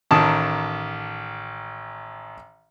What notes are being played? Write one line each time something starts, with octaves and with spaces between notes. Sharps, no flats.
A1 D#3 A5 D#6